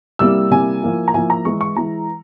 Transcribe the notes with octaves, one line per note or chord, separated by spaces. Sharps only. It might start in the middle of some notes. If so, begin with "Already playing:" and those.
C3 G3 A#3 E4 E6
C3 G3 A#3 E4 G#5
F3 A#3 E4
A#5
F3 A#3 E4 G#5
A#5
E3 G#3 E4 C#6
C#6
E3 G#3 E4 A#5